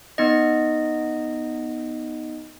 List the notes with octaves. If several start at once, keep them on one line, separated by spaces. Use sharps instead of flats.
B3 D#4 D#5